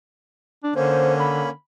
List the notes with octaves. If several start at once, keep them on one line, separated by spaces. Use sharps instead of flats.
D4
D3 A#3 C#4 C5
B5